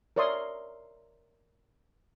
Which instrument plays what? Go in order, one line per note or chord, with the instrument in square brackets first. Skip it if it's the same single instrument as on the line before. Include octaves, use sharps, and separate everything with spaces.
[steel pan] A#4 C#5 D5 E5 C6 D#6